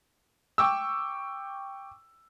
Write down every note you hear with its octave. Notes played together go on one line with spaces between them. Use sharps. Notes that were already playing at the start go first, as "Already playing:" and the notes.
G5 C#6 D6 E6